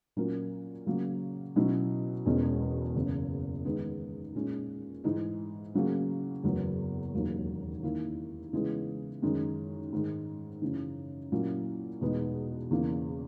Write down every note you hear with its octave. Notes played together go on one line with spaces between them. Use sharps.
A#2 F#3 C#4 F#4 A#4
C#3 F#3 A#3
B2 F#3 C#4 E4
E1 E2 B2 G#3 C#4
F#1 E2 C#3
D#3 G#3 B3
A#2 G#3 C#4
G#2 E3 G#3 D#4 G#4
C#3 F#3 A#3 C#4 G#4
F#1 E2 C#3 F#3 B3
E1 D#2 D#3 F#3 A#3
D#3 A#3 E4
C#3 E3 G#3 B3
F#2 D#3 G#3
G#2 D#3 G#3
F#2 C#3 E3
A#2 F#3 A#3 C#4 E4
E2 B2 G#3 B3 D#4
E2 C#3 E3 A#3